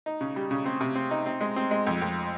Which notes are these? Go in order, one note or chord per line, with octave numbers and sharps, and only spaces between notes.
D#4
C#3
G3
C#3
C4
C3
C4
D#4
C4
G#3
C4
G#3
F2
F2